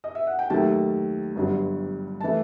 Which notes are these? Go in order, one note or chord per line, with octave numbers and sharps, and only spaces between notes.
D#5
E5
F#5
G5
D#2 D#3 F#3 A3 A5
G1 G2 F#3
E3 A3 A5